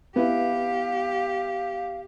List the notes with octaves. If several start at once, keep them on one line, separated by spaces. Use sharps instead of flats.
B3 E4 G4 F5